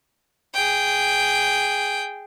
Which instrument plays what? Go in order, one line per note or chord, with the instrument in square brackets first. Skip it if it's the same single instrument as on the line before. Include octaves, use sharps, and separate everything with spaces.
[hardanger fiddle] G#4 G5